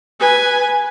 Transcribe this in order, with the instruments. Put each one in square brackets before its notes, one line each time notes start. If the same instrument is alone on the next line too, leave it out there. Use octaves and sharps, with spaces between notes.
[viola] B4 G#5